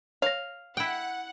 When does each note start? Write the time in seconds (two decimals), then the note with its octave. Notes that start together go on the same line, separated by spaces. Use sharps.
0.22 C#5 F5 A#6
0.77 E4 F#5 G5